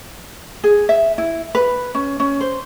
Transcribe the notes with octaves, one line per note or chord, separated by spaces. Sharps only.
G#4
E5
E4
B4
C#4
C#4
C5